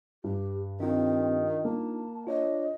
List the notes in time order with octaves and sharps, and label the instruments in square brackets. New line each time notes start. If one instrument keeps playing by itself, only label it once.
[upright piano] G2 [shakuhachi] G4
[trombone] D#3 [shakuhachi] C4 [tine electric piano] D4 D#4 F4
[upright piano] A#3 [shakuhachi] A5
[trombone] D4 [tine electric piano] F4 C#5 [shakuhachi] D#5